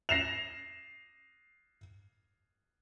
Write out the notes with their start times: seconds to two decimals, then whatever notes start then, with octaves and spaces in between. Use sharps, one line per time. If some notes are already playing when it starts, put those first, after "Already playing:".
0.09 A#6 C7 E7 F7